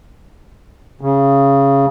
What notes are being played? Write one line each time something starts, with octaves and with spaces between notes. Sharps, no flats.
C#3